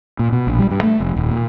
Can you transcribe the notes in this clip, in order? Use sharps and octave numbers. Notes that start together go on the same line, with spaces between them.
A#2
B2
A#1
G3
G2
A3
F1
D#1
A#2